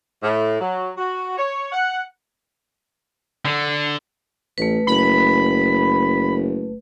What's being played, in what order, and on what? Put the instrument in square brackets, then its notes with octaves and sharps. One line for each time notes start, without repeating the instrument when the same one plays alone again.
[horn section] A2
F#3
F#4
C#5
F#5
[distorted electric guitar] D3
[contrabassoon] A1 [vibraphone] A3 B4
[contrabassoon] F#1 [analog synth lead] B5